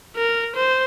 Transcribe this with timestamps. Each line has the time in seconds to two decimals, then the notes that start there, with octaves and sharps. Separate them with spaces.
0.16 A#4
0.56 C5